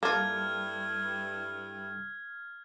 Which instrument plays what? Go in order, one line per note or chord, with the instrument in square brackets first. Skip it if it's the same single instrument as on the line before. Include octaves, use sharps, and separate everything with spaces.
[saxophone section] G2 E4 [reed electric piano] G3 A4 [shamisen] A#3 F4 [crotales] F6 G#6